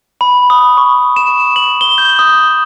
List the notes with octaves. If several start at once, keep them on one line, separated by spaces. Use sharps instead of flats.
B5
D#6
C#6
E7
F#7
G7
G6
D#6